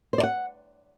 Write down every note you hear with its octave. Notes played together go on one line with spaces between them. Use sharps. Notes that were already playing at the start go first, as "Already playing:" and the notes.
C5
D5
F#5